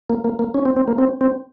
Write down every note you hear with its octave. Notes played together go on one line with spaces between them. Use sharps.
A#3
A#3
A#3
C#4
C4
C4
A#3
C4
C4